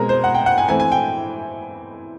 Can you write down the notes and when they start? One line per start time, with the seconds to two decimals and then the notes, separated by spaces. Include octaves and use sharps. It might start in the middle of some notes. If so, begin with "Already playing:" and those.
Already playing: B2 G#3 C4 A#4
0.09 C5
0.24 F#5
0.34 G5
0.46 F#5
0.58 G#5
0.69 E3 A3 C4 G#5
0.80 G#5
0.92 G5